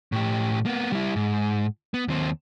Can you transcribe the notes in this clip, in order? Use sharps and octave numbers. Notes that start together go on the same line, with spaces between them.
A2 G4
A#3 B3
G3 E4
G#2
B3
D#2 C4